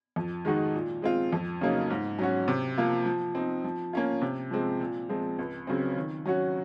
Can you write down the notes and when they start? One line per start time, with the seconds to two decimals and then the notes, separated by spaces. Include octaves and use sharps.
0.16 F2
0.45 D#3 G#3 D#4 F#4
0.74 A#2
1.02 G#3 C4 F4
1.33 F2
1.61 C#3 F#3 A#3 D#4
1.90 G#2
2.19 F#3 C#4 F#4
2.48 C3
2.78 F3 A#3 F4
3.06 F3
3.35 C4 D#4
3.64 F3
3.93 A#3 C#4 F4
4.22 C3
4.51 F3 G#3 C4
4.80 A#2
5.09 F3 G#3 C4
5.39 C#2
5.67 C#3 F#3 C4
5.96 D#3
6.25 F#3 C#4 F#4